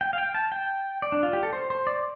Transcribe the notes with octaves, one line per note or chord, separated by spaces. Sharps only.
G5
F5
G5
A5
G5
D5
D4
F4
G4
A4
C5
C5
D5